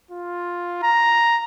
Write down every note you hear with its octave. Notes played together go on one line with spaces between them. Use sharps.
F4
A#5